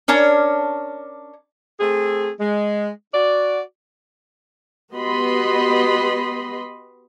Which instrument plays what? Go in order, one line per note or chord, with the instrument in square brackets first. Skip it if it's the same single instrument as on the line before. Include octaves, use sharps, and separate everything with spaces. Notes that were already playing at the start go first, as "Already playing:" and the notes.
[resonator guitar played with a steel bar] C#4 D4 A#4 C#5
[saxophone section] A3 C4 G#4
G#3
F#4 D5
[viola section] B3 F#4 G4 D#5 B5 C6